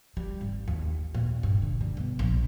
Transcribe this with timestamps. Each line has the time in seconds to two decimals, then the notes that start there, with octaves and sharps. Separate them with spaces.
0.17 G3
0.41 G#1
0.68 D#2
1.14 A#2
1.43 G2
1.62 D3
1.81 G3
1.97 B2
2.19 A#1